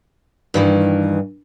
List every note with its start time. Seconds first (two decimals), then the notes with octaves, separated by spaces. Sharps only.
0.54 G2 D#3 E3